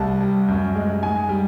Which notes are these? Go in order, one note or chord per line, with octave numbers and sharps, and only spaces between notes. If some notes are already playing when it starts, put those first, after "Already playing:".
Already playing: C2 A5
G3
F#2
G#3
G#2 G#5
G3